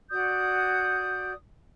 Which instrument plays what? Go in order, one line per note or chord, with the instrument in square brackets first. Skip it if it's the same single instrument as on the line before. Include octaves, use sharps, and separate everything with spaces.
[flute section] F#4 D5 D#6 G6